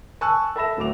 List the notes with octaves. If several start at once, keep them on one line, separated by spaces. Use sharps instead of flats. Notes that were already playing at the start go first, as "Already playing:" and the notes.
G#5 A5 C#6 E6 F#6
A4 E5 B5 A#6 E7
D1 F#3 A3 D6 F7